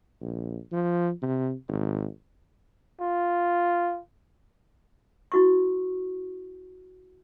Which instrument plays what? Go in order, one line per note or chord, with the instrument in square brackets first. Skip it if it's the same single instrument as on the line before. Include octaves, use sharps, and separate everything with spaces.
[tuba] A#1
F3
C3
G#1
[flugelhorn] F4
[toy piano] E4 F#4 C#6